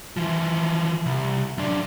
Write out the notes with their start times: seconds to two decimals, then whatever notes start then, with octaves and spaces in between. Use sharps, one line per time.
0.17 E3 F3
1.06 C2
1.58 F#2 D4